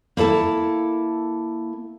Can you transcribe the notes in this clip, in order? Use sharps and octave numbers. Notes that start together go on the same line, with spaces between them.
A#3 E4 A4 A5